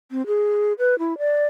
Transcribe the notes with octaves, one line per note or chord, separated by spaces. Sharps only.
C4
G#4
B4
E4
D5